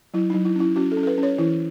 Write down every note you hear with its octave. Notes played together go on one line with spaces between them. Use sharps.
F#3 E4
F#3 D#4
E4
C#4 E4
C#4 F#4
A4
C#4
A4
B4
C#4
C#5
E3 E4